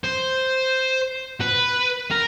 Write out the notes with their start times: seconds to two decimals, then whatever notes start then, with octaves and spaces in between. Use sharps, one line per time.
0.04 C5
1.41 B4
2.11 A#4